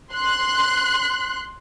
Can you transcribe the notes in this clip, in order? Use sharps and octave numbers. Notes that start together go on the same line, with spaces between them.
C6 F#6